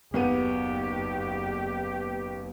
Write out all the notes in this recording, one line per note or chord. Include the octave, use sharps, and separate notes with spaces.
F#1 D#2 B3 G4 D#7